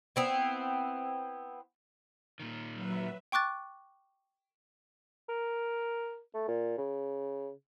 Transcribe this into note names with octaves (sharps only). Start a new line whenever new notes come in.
B3 C4 E4
A#2 D#3
F#3 B4 E5
G5 C#6 D6 F#6 A6
A#4
A3
A#2
C#3